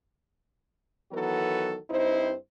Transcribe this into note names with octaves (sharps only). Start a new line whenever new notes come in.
D#3 E3 F#3 B3 F#4 A4
G2 C4 D#4 E4 C5